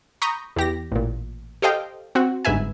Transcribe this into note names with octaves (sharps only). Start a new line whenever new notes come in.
A#5 B5 C#6 D#6 G6 A#6
E2 G4 A#6
A1 A#2
G4 A4 C5 D#5 F5 G5
C4 F#4
G1 G#2 B4 E5 G#5